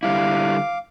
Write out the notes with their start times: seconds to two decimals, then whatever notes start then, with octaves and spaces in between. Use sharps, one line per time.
0.03 D3 G3 E4 F5 D6